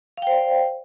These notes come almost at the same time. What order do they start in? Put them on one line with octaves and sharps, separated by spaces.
F5 G5 C5 D5